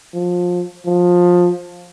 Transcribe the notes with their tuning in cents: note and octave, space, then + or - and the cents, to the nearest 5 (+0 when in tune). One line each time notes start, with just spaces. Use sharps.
F3 +25
F3 +20